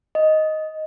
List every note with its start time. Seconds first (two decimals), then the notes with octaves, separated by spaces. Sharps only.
0.15 D#5